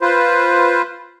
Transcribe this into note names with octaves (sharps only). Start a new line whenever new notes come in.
F4 B4 C5